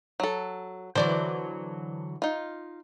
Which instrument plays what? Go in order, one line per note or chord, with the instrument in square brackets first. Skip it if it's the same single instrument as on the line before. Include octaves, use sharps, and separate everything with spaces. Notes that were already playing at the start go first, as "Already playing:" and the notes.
[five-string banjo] F#3 A4
[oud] D3 E3 F#3 [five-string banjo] C5 D5
[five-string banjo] D#4 F4